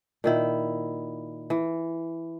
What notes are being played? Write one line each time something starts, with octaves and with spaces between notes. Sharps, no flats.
A#2 D#3 E4
E3